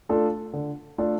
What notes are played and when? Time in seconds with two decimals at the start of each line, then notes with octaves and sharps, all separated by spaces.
0.09 A3 D4 F4 A4
0.53 D3
0.98 A3 D4 F4 A4